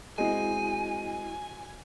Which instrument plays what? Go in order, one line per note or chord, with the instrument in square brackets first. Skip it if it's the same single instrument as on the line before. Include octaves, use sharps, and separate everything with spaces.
[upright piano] G#3 C4 G#4 [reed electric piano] E4 F#4 D#5 [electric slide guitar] G#5